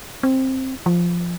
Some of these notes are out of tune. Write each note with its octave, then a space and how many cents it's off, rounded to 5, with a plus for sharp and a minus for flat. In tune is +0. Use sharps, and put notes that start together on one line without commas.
C4 +10
F3 -5